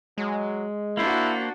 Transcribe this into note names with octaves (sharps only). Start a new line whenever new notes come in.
F#3 G#3
A#3 D4 E4 F#4 C5